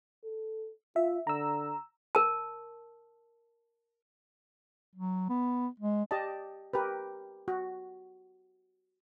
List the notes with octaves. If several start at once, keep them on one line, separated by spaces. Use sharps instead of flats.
A4
F4 E5
D3 A#5 E6
A#4 A5
F#3
B3
G#3
G4 D5 D#5 A5
G4 A#4 B4
F#4